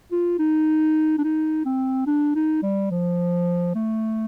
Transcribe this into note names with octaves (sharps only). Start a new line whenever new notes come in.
F4
D#4
D4
D#4
C4
D4
D#4
G3
F3
A3